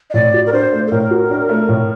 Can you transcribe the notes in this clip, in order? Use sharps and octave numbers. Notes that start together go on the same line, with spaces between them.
D#5
A2 D5
F#4
A#4
D4 C5
A3
A4
A2 A#4
F#4
D4
A3
A2